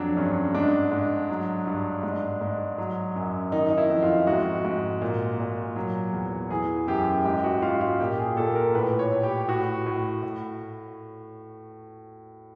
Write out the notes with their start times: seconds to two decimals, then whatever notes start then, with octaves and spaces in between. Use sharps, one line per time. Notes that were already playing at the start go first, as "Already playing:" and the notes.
Already playing: F2 F#3 D4
0.17 G2 C#4
0.54 G#2 D4
0.92 G#2
1.29 F#3
1.67 G2
2.03 G#2
2.41 G#2
2.78 F#3
3.16 F#2
3.52 D#3 D#4
3.70 D#4
3.77 E4
3.89 F2
4.02 F4
4.27 G#2 F#4
4.65 G#2
5.02 A#2
5.39 A#2
5.76 F#3
6.13 E2
6.50 E3 G#4
6.88 F#2 G4
7.25 G#2 G4
7.44 F#4
7.62 G#2 F4
7.81 F4
8.00 A#2 G4
8.18 G#4
8.37 A#2 A4
8.55 A#4
8.74 A2 B4
8.99 C#5
9.12 A2
9.23 G4
9.48 A2 F#4
9.86 A2
10.23 A2